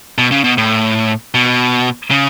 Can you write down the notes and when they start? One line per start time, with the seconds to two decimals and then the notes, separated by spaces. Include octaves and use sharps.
0.18 B2
0.32 C#3
0.44 B2
0.58 A2
1.34 B2
2.11 C#3